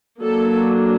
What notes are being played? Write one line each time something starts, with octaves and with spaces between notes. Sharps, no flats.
F#3 A#3 D4 A4